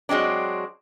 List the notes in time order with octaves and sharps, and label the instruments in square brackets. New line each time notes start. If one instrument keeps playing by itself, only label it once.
[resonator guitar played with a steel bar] F#3 G#3 C4 D4